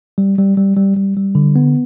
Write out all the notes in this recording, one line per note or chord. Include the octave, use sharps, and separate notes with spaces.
G3
G3
G3
G3
G3
G3
D3
B3